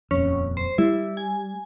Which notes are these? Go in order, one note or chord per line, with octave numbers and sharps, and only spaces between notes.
D#1 F2 C#4
C5
G3 E4
G#5